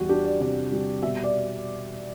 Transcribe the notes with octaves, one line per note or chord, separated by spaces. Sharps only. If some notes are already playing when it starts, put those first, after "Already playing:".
Already playing: E2 G3 F#4
D4 G4
D5
C3 D5
G3
B2 E5
D5